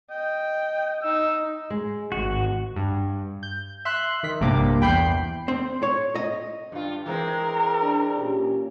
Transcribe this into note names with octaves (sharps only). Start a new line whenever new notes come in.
D#5 G5
D#4 E6
G#3
G#1 F#4
G2
G6
E5 C6 F#6
D#3 B6
A#1 G2 C3 A#3 D6
E2 G5 B5 G6 C7
C4
C#5
D#5
G2 F4
E3 G#3 C4 A#4
D4
A#2 C#4 G4